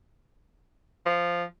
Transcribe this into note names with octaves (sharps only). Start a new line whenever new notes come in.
F3